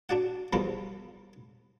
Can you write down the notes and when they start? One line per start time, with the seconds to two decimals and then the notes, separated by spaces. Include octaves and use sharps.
0.09 D4 F#4 D5 F#5
0.53 E2 B2 F3 G3 B3 A#4